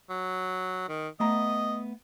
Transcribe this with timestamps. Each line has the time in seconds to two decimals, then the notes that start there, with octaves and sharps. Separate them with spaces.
0.10 F#3
0.89 D#3
1.20 A3 B3 D#5 A#5